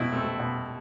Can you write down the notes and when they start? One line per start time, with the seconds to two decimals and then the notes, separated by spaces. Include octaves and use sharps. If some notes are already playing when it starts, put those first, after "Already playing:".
Already playing: B2 C4 E4
0.13 A3 C4
0.39 B2